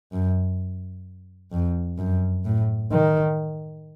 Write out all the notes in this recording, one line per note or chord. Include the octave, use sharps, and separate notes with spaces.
F#2
F2
F#2
A2
D#3